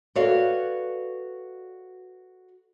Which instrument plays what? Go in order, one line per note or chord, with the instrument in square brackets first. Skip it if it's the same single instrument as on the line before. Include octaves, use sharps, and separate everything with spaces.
[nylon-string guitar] F#4 A4 B4 C#5 D5 F5